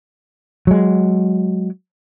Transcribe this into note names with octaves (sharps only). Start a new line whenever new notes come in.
F#3 G#3